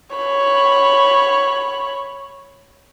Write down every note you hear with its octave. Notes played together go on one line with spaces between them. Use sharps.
C#5 B5